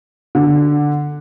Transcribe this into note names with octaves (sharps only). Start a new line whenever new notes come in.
D3